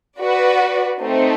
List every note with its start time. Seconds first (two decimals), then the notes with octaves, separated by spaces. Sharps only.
0.19 F#4 B4 D5
0.99 A3 C4 D#4